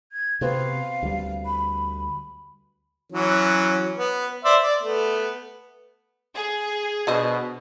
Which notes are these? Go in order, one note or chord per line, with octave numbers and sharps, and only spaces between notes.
G#6
C3 B3 C4 F#4 F5
D2 G3
B5
E3 F#3 C#4
B3
C5 D5 E5
D5
A3 B3
G#4
B2 D3 C5 D#5